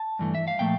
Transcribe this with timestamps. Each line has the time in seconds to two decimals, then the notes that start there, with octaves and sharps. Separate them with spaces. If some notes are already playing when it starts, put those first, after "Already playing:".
Already playing: A5
0.19 G2 E3 A3
0.35 E5
0.48 F5
0.59 A#2 F3 A3 G5